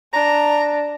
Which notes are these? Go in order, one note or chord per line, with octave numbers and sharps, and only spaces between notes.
D4 A#5